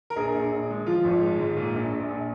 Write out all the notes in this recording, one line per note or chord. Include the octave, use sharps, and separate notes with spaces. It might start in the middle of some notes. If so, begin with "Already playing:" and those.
A#4
A#1 G#4
A#1
A#1
G#3
F3 F4
G#1
G#3
G#2
A#2
A#1
A#1
A#1